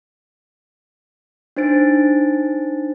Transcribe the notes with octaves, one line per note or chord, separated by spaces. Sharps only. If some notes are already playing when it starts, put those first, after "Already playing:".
D4 D#4 C5 A6 D7